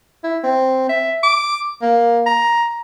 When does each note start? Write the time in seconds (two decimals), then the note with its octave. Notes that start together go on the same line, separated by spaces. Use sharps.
0.24 E4
0.44 C4
0.89 E5
1.23 D6
1.82 A#3
2.26 A#5